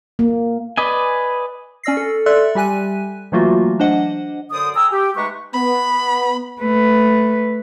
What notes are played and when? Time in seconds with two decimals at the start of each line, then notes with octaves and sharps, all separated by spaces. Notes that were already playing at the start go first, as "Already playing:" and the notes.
0.19 A#3
0.77 B4 D5 D#5 G#5
1.83 C#4 D5 E6 A#6 C7
1.97 A4
2.26 A4 D5 E5 C6 E6 F#6
2.55 G3 G4 G#5 F#6 D#7
3.32 E3 F#3 A3 A#3 F4 F#4
3.79 D4 C5 D#5 F#5
4.52 F#2 D3 C5 D5 D#6
4.75 G#4 G5 G#5 A#5 D#6 E6
4.92 G4
5.16 G#2 G#3 A3 D#4 B4 C#6
5.53 B3 B5
6.61 A3 B4